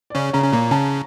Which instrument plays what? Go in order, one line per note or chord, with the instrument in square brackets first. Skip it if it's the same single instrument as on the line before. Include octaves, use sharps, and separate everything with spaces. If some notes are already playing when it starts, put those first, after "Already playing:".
[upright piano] D5
[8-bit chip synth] C#3 C#4 [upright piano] C#5
[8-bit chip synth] C#3 C#4 [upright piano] A#5
[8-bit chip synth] C#4
[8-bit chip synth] A#2 A#3 [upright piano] A#5
[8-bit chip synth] C#3 C#4 [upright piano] A5